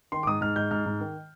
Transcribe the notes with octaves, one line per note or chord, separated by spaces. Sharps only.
D#3 C6
D6
G#2 D#6
G#2 F6
G#2 G6
G#2 F6
G#2
D#3